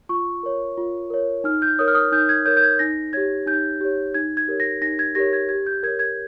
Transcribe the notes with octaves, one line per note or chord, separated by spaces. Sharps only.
F4 C#6
A#4 C#5
F4
A#4 C#5
D#4 F6
G6
A#4 C#5 D#6
F6
D#6
D#4 G6
G#6
A#4 C#5 G6
G6
G#6
D#4 A#6
G4 C#5 G#6
D#4 G6
G4 C#5
D#4 G#6
G#6
G4 A#4 C#5
A#6
D#4 A#6
G#6
G4 A#4 C#5 A#6
G#6
G4 G#6
G6
A#4 C#5 G#6
G#6